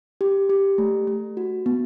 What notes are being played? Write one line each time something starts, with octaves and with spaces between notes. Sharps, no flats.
G4
G4
A3
A3
F#4
B3